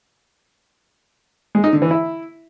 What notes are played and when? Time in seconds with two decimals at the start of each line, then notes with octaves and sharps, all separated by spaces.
1.55 G#3
1.64 D#4
1.73 D3
1.82 E3
1.91 E4